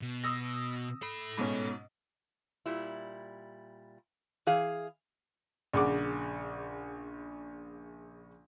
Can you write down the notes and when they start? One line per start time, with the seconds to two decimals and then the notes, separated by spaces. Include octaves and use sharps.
0.01 B2
0.24 D#6 E6 A#6
1.02 A4 B5
1.37 G#2 B2 C#4
2.66 A#2 G3 E4
4.47 E3 G#4 F5
5.73 A#1 C#3 F#5 D6